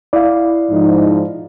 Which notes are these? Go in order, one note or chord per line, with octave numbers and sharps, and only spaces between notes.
E4 D5 F5
G#2 F3 D#4